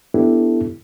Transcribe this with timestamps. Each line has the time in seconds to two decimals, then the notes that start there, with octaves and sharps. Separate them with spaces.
0.14 B3 D4 E4 G4 A4